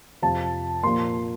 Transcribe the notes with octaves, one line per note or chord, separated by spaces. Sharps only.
F2 C3 F3 A5
A#2 F3 A#3 C6